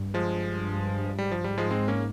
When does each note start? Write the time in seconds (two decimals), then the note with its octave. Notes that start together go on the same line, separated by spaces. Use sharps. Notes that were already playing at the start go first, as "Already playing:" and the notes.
Already playing: G2
0.14 F3 G#3
1.18 G#2 G3
1.32 G2 F3
1.44 G#2 G3
1.58 F3 G#3
1.71 G#3 C4
1.88 A#3 C#4